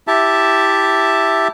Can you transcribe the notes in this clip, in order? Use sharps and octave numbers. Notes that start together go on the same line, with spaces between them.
E4 G4 E5 A5